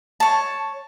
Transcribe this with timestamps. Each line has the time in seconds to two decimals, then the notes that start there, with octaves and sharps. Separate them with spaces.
0.20 C#5 A5